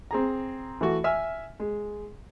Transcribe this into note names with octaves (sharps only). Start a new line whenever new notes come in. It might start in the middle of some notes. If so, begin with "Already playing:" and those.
C4 G#4 A#5
E3 A3 F#4
E5 G#5 E6 F6
G#3